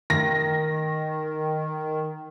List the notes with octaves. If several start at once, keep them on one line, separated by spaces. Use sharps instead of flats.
D#3 A#6